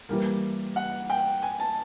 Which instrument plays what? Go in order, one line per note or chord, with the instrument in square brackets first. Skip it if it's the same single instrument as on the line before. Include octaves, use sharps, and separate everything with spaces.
[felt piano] E3 G3 A#3
[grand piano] F#5
G5
G#5
A5